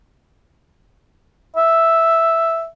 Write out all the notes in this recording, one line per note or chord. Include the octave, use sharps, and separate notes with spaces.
E5